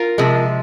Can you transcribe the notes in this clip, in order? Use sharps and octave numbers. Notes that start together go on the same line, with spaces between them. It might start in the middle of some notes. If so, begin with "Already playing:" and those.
Already playing: F4 A#4
C3 F3 G#3